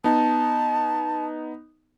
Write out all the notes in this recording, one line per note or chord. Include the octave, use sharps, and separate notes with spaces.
B3 D#4 A5